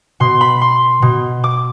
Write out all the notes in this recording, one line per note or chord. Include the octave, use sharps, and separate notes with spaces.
B2 C6
B5
C6
B2
D6